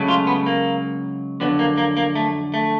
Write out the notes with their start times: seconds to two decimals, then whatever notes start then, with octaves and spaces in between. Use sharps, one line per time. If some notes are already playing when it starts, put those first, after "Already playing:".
Already playing: C#2 C#3 F#3 A3
0.08 F4
0.27 B3
0.46 A#3
1.40 F2 D3 F#3 B3
1.59 A#3
1.78 A#3
1.97 A#3
2.15 A3
2.54 A3